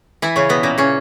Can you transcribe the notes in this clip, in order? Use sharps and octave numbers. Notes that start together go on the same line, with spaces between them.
E3 E4
C#3 C#4
B2 B3
A#2 A#3
C#3 C#4